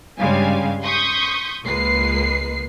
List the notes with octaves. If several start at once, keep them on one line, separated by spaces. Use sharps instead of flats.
G2 C#3 G3 G#3 F5 G#5
C6 C#6 D#6 G6 B6
C#2 G#3 A#3 B4 C7